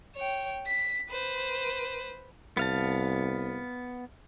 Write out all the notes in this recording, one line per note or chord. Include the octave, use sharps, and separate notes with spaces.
C#5 G5
B6
B4 C5
C2 B3 F5 A5